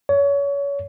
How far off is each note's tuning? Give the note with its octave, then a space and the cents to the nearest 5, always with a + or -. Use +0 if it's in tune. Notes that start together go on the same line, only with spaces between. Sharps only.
C#5 +25